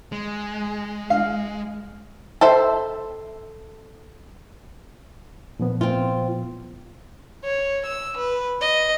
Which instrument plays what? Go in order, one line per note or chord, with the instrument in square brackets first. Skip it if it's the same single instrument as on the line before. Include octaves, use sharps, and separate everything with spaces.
[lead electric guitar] G#3
[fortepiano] F5
[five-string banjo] A4 C5 E5
[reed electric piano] A#2 F3 B3
[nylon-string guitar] C4 F4
[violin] C#5
E6
B4
D#5